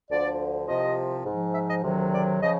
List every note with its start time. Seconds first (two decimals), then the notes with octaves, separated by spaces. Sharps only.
0.10 D2 D3 F3 D5
0.67 C2 C3 F3 D#5
1.26 G#2 F3
1.54 E5
1.69 D#5
1.84 D2 C3 D#3 F#3
2.13 D5
2.41 C#3 F3 D#5